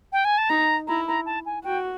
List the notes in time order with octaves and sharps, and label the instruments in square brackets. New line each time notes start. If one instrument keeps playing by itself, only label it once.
[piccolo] G5
G#5
A5
[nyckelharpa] D#4 [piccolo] A#5
[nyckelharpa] E4 [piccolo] A#5
[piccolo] A#5
A5
G#5
[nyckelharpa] F#4 [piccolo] G5